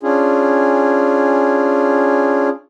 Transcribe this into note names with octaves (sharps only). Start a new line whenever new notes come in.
C#4 D4 F4 G#4